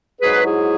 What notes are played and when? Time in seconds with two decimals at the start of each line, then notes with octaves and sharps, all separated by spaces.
0.21 G#2 F#3 G#4 B4
0.45 E4 G#4